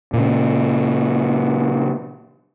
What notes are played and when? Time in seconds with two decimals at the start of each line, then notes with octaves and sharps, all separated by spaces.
0.14 A#2 C#3